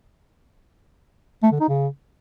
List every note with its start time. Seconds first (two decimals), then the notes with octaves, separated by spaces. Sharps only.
1.43 A3
1.52 D3
1.60 D#4
1.69 C#3